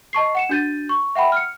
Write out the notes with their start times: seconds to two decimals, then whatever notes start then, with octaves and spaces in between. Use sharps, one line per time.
0.13 D#5 A5 C#6 C7
0.35 F#5 C#7 E7
0.49 D4 F#4 G6 A6 D#7
0.89 C#6
1.15 E5 F#5 G5 B5
1.32 F6 C#7